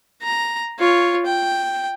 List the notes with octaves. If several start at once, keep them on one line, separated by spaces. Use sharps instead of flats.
A#5
F4 C#5
G5